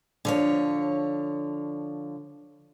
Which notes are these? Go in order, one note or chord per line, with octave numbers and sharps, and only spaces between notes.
D3 F3 C#5